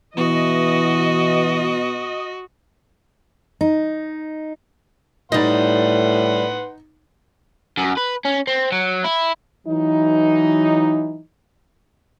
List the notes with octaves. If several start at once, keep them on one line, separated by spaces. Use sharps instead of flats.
B2 E3 F#4 D#5
D#4
A2 G3 D#4 B4 D#5 F#5 C6 A6
F#2
B4
C#4
C4
F#3
E4
E3 F#3 D#4